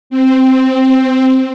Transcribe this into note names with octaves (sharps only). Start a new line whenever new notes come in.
C4